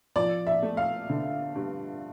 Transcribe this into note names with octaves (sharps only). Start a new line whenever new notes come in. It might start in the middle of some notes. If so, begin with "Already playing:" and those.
F3 D5
E5
A3
F5
D3
G2